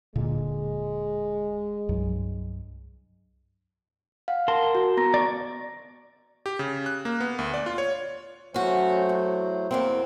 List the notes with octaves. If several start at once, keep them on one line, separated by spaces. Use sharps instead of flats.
D1 A#2 D3 G#3
C2 G2 F#3
F5 F#5
A#4 A5 C6
F#4
B3 A#5 A#6
D5 C#6
G4
C#3
F#6
A#3
B3
D2
D5
F4
C#5
F#3 A3 C#4 F#4 C5
E2
E2 A#3 C4